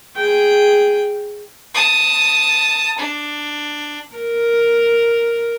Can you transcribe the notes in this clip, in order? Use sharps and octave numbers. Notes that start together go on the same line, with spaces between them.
G#4 G5
A5 D#6
D4
A#4